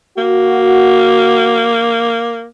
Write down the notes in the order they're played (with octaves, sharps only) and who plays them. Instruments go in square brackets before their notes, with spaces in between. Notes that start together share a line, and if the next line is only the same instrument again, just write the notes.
[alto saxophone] A#3 [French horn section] F#4